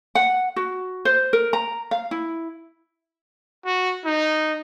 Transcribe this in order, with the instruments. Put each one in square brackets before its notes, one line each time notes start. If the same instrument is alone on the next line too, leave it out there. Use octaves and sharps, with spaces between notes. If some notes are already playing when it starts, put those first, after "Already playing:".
[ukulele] F#5
F#4
C5
A#4
A#5
F5
E4
[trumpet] F#4
D#4